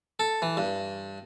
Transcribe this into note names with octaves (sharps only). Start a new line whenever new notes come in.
A4
E3
G2